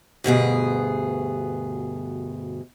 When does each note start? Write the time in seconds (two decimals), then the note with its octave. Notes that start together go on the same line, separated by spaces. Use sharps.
0.24 D2 G2 B2 G#4